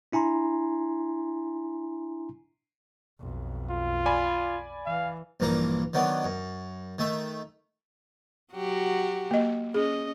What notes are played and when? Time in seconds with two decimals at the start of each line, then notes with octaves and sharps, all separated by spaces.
0.12 D4 E4 G#5 A#5 C6
3.19 B1 F2
3.70 F4
4.06 D5 G#5 B5
4.86 E3 F5
5.40 A#1 G2 E3 A#3 A#5
5.93 D#3 F#3 B3 D4
6.24 F#2
6.98 D#3 A3 E5
8.53 F#3 F#4 G4
9.31 A#3 D#5
9.74 C#4 G#4 D#5